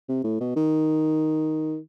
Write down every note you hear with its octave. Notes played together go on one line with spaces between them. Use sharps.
C3
A2
B2
D#3